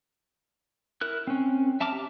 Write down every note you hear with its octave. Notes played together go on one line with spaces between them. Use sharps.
E4 A#4 F#6
C4 C#4
E5 A5 A#5 D6 F6
G4